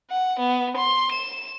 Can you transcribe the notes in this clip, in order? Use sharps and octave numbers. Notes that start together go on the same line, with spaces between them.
F#5
B3
C6
E7